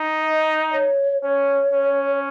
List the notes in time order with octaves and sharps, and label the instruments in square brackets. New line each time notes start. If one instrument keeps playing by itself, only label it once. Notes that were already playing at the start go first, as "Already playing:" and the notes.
Already playing: [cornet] D#4
[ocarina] D#5
C#5
[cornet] C#4 [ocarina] C#5
[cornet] C#4